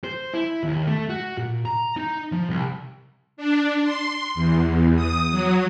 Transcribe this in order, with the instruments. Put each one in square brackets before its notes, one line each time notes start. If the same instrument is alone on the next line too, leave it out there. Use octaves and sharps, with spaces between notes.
[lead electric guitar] C5
E4
D#2
A3
F#4
A#2
A#5
D#4
F3
C2
[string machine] D4
C6
E2
D#6
F#3